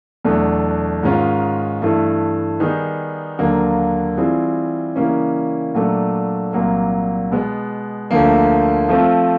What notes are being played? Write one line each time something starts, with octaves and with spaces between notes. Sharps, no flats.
E2 B2 F#3 A3 D4
G#2 D#3 G#3 C#4 F4
G2 E3 A3
D#3 G3 B3 D#4 G#4
D#2 D3 F#3 A#3
E3 G3 C4 F4 G#4
C#3 E3 G3 A#3 C#4
A#2 F#3 A3 D4
C2 A#2 F#3 A#3
B2 G#3 B3
D2 D3 F3 A#3
F3 A3 C4 F4